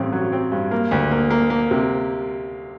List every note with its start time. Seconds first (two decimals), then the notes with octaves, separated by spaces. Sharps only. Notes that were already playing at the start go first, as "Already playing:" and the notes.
Already playing: A1 G2 C4
0.12 F#3
0.32 C4
0.52 G2
0.71 A#3
0.91 D2
1.11 A#3
1.30 A#3
1.50 A#3
1.71 C3